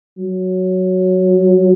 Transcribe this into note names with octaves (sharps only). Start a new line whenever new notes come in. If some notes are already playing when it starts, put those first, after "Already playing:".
F#3